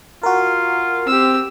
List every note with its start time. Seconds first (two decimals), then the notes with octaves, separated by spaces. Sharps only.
0.23 F4 F#4 A#4
1.07 C4 G4 E6